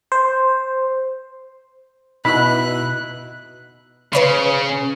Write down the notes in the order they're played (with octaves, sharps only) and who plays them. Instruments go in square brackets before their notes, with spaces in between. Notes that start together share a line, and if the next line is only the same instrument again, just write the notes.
[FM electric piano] C5
[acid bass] B2 [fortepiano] D#4 E4 [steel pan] B5 [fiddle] F#6
[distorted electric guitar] C#3 [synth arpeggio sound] B4 C#5 B5